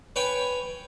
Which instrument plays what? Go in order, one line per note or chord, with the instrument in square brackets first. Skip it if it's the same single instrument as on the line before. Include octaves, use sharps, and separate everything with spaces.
[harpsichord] B4 C#5 G5 G#5